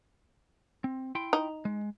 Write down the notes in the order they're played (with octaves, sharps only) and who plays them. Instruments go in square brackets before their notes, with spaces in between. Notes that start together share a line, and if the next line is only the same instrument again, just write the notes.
[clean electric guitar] C4
E4 G5 C6
[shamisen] D#4
[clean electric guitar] G#3